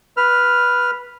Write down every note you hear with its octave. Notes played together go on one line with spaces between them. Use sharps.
B4 F6